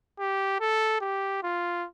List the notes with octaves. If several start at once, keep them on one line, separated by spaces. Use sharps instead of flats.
G4
A4
G4
F4